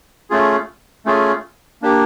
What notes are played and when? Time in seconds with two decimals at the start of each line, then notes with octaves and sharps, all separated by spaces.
0.30 A3 C#4 F4 G#4
1.06 A3 C#4 F4 G#4
1.82 A#3 D4 G4